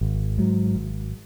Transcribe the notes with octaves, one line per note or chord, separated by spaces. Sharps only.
G#1
G#2 F#3
G#1